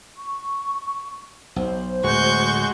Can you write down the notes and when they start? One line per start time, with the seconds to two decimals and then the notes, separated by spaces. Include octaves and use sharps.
0.18 C#6
1.56 B1 C5
2.04 D1 G#3 F#4 C#6 G6